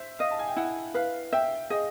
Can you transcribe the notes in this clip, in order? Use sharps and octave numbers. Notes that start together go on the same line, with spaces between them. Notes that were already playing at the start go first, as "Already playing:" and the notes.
Already playing: C5 E5
D#5 F5
A5
G#5
G5
E4 F#5
B4 F5
E5 G5
G#4 D#5